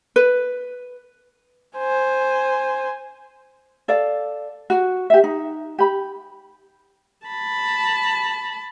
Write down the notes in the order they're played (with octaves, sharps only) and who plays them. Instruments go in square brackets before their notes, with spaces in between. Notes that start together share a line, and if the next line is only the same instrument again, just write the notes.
[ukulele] B4
[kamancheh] C5 G#5
[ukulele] A4 D5 F5
F#4
G4 E5
D#4
G4 B5
[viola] A5 B5